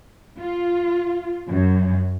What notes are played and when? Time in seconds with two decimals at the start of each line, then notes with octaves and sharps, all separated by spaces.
0.39 F4
1.49 F#2